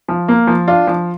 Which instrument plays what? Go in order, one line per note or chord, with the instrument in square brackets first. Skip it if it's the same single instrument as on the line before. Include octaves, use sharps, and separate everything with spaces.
[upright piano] F3
A#3
F3
D4 F4
F3